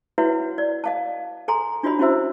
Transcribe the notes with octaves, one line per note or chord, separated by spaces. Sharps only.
E4 F#4 B4 C#5 E5 F#5
D5
D#5 F5 A5
A4 G#5 A#5 C6
D4 F4 F#4 C#5 D#5 B5
C#4 E4 F#4 C5 E5 E6